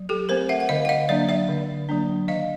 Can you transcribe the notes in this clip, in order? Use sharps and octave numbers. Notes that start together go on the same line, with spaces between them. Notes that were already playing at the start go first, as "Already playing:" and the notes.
Already playing: F#3
G4 A4
A3 C4 A#4 C5
E5 F#5
F#5
D3 D#5 F5
F#5
D#5 F5
F#3 A#3 D4 D5 E5
D5 E5
D3
F#3 A#3 D4
D#3 D#5 F5